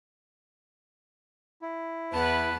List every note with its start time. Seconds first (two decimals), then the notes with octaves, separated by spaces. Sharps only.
1.62 E4
2.12 E2 B3 B4 A5